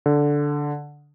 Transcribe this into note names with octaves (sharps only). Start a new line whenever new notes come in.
D3